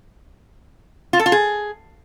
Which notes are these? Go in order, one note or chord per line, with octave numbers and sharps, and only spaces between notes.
F4
A4
F4
G#4